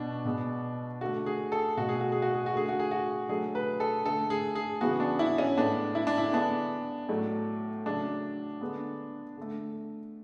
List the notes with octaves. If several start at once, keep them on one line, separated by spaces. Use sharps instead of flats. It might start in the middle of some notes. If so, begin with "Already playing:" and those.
Already playing: B2 B3 D4
B2 G#3 B3
D3 A3 F#4
G#4
A4
B2 A3 F#4
G#4
F#4
G#4
F#4
G#4
F#4
D3 A3 G#4
F#4
G#4
F#4
D3 F#3 A3 G#4
B4
A4
D3 A3 A4
G#4
G#4
C#3 E3 G#3 B3 F#4
D4
E4
C#4
A2 G#3 B3 D4
E4
D4
E4
D3 G#3 B3 D4
A2 F#3 A3
C#3 F#3 A3 D4
D3 G#3 B3
D3 A3